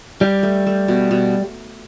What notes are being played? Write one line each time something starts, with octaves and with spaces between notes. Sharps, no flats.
G3 G4
A3
A3
B2
B2